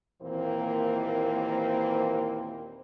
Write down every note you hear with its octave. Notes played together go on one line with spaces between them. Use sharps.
D#2 A#2 E3 A#3 C4 C5